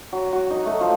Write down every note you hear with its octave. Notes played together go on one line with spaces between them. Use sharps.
F#3
F#4
D#4
A3
F3